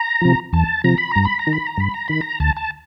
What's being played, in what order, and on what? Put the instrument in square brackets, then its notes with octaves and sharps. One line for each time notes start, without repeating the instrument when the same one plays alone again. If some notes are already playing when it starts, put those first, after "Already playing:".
Already playing: [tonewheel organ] A#5
C3 F3
E2 A5
C3 F3 A#5
B5
G2 A#5
B5
A#5
D#3
B5
A#5
G2 B5
A#5
D#3 B5
A#5
D2 A5
A5